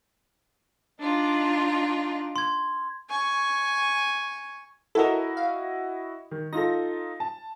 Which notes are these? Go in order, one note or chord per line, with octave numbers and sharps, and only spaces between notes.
D4 D#4 F4
C6 G#6
G#5 C#6
E4 F#4 A4 A#4 D#5
F5
D#3
D#4 F4 A4 A#6
A5